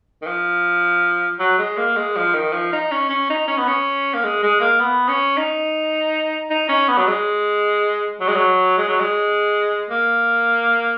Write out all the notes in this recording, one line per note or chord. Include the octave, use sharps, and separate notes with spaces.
D#3
F3
F#3
G#3
A#3
G#3
F3
D#3
F3
D#4
C#4
C#4
D#4
C#4
B3
C#4
A#3
G#3
G#3
A#3
B3
C#4
D#4
D#4
C#4
B3
F#3
G#3
F#3
G#3
F#3
G#3
F#3
G#3
A#3